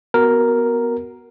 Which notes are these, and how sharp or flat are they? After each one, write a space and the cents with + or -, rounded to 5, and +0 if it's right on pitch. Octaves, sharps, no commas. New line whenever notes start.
B3 +0 F#4 +5 A#4 +0